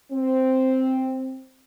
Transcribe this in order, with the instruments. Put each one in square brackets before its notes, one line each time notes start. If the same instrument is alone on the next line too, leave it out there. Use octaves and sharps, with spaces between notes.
[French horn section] C4